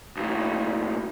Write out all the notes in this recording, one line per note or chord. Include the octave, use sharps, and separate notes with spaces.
B1 A2